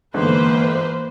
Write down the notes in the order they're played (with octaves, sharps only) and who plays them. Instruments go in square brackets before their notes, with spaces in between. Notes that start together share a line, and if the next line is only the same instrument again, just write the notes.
[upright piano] G1 G#2 D3 [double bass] E3 [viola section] A#3 B4 C5